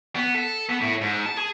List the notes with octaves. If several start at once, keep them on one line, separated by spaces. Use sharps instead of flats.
B3
A4
B3
A2
G#2
A5
G#4